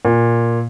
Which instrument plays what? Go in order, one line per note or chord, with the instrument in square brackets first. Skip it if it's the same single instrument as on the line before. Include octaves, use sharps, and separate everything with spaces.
[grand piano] A#2